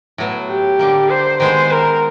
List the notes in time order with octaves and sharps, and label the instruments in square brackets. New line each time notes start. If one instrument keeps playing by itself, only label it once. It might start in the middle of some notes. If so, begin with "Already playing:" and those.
[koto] A2 F#3 B3
[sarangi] G4
[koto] D3 G3 A#3
[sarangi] C5
[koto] D#3 G#3 B3 [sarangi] C5
[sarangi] A#4